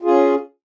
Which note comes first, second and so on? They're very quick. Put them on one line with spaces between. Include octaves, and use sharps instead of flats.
F4 G#4 C#4